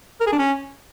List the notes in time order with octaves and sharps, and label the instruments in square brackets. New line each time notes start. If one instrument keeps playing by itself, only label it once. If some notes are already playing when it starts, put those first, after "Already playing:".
[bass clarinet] A#4
G#4
D4
C#4